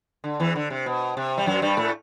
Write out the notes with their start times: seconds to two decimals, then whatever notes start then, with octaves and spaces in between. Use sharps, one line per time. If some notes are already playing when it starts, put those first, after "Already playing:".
0.24 D3
0.40 E2 E3
0.55 D3
0.70 C3
0.86 B2
1.17 C3
1.38 G3
1.46 F#2 F#3
1.62 G2 G3
1.77 A2 A3